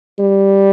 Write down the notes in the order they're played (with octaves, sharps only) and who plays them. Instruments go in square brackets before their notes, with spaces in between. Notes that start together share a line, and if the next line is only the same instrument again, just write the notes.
[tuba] G3